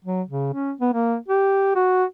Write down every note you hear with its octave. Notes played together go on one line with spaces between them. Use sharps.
F#3
C#3
C#4
B3
A#3
G4
F#4